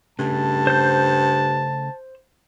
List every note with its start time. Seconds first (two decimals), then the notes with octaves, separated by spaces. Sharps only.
0.19 G2 C#3 A3 A5
0.67 C5 G6